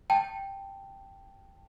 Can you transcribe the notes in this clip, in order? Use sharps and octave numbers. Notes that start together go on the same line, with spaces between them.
G5 A5